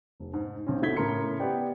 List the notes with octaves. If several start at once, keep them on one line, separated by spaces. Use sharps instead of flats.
F1
G#2
B1 C4 C#4
A3 E4 F#4 G#6 B6 G7
A2 C#3 A#4 A#5 C6 C#7
B3 G4 B4 D5 G5